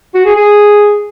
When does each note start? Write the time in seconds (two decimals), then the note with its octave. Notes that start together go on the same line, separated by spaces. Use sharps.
0.14 F#4
0.25 G#4
0.36 G#4